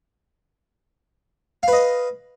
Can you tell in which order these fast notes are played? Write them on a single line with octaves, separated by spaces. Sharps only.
F5 B4 D#5